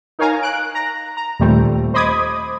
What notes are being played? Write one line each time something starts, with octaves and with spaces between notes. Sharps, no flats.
D#4 A#4 C#5 F5 G#5 A#5
F#6 D7
A#5
A#5
D#2 A#2 G3 A3 C4
C5 D#5 B5 D6 D#6 G#6